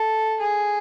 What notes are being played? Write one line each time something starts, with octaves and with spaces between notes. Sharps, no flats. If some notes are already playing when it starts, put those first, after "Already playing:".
Already playing: A4
G#4